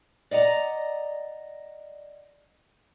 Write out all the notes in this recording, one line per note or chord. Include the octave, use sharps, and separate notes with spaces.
D5 D#5 F#5 A#5